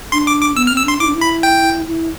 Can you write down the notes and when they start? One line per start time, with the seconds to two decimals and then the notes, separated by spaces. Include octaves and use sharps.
0.12 D4 C6
0.27 D6
0.41 D6
0.56 B3 E6
0.67 F6
0.71 C4
0.77 E6
0.85 D4 C6
1.00 E4 D6
1.07 D4
1.15 E4
1.21 B5
1.43 G5
1.88 E4